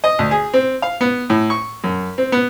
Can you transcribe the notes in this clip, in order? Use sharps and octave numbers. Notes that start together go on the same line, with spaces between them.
D#5
D2
G#4
C4
F5
B3
A2
C#6
F#2
C4
B3